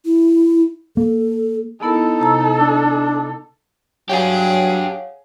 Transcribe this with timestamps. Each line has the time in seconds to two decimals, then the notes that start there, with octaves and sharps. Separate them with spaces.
0.05 E4
0.97 A#3 A4
1.83 B3 D#4 E4 A4 A#4
2.20 C3 A#5 E6
2.57 D4 E6
4.10 F#3 D4 G4 G#4 C#5 F5 F#5